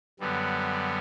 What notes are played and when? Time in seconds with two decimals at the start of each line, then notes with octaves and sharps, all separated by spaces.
0.20 F#2 D3 G3 B3